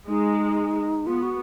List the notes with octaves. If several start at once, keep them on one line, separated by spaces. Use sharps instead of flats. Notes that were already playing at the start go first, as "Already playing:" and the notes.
G#3 D#4
B3 F4
F#4